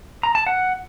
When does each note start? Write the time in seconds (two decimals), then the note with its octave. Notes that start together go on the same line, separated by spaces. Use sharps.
0.23 A#5
0.35 A5
0.47 F#5